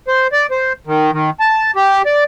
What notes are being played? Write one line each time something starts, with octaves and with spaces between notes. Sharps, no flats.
C5
D5
C5
D#3
D#3
A5
G4
D5